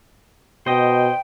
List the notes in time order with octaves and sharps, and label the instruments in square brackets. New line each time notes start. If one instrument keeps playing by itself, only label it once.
[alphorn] B2 [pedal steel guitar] C5 D#5 [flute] G5